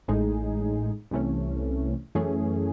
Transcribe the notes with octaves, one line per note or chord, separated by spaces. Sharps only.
A1 A2 G#3 D#4 G#4
C2 C3 E3 A3 C#4
F#2 E3 A3 C#4 G#4